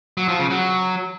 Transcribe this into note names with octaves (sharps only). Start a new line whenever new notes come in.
F#3
F3
C#3
F#3